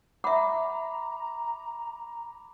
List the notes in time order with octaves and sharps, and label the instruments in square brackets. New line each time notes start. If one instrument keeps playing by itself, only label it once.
[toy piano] E5 F#5 [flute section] A#5 [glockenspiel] B5 D6